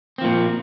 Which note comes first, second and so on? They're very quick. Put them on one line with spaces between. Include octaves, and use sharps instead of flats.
C4 F3 A#2